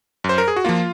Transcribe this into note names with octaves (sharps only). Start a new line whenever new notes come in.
F#2
C5
A#4
G#4
F#4
F3 A#3 F4